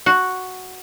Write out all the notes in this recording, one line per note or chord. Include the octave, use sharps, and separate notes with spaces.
F#4